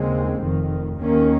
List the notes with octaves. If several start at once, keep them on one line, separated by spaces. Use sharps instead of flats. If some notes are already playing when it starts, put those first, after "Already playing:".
Already playing: D#2 C#3 G#3 C4
F1 F2 D#3
D#2 D#3 A#3 C#4